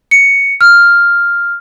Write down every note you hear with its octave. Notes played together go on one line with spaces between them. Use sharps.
C#7
F6